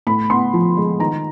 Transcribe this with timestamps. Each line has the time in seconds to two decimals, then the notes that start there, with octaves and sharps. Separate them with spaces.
0.07 A2 B5
0.30 B3 C6
0.53 F3
0.77 G#3
0.99 D#3 A#5